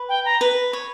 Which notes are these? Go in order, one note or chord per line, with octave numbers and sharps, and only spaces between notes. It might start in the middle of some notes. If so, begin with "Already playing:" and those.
Already playing: B4
G5
A#5
B4
C#5